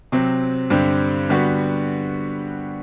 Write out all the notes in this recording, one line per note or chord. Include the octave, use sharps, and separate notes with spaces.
C3 F#3 C4
G2 D3 G3 C4
D3 G3 B3 F#4